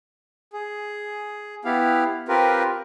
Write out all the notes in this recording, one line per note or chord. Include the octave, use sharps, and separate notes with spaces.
G#4
B3 E4 G4 F5
C4 F4 G4 A#4 B4